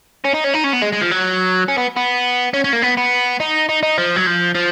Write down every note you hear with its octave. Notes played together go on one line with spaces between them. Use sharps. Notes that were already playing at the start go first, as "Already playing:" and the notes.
C#4
D#4
C#4
D#4
C#4
B3
G#3
G#3
F3
F#3
C#4
B3
B3
C#4
C#4
A#3
B3
B3
D#4
D#4
D#4
F3
F#3
F3
F3